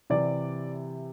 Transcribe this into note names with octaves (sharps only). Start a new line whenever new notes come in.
C3 E3 D5